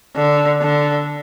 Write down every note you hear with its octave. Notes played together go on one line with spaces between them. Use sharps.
D3
D3